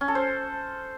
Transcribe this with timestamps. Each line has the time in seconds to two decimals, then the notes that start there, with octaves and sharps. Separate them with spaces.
0.01 C#4
0.08 A4
0.15 C5